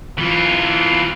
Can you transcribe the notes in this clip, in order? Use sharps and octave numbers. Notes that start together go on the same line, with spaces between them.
E3 F4